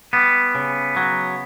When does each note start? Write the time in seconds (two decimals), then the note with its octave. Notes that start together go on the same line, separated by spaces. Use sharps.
0.13 G3 B3
0.55 C#3
0.96 F#3